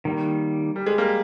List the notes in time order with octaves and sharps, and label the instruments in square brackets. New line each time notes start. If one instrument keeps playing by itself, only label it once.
[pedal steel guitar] D#3 G3 A#3
[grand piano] G3
G#3
G3 A#3